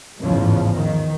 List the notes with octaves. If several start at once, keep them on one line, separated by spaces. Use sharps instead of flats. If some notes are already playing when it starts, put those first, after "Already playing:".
A1 E2 G#2 C#3 F3
D#3